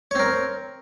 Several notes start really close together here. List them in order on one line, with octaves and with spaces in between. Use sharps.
C#5 C4 A#4